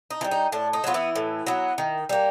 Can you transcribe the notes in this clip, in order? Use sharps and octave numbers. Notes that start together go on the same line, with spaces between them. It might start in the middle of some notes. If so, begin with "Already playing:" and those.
D#4
E3
G3
D#4
A2 D4
D#4
F#3 B3 F4
E3 E4
A2
F#3 B3
D#3
G3 A#3